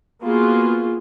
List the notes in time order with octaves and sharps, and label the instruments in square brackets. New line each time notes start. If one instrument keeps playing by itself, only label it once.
[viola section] A#3 B3 F4 F#4 G#4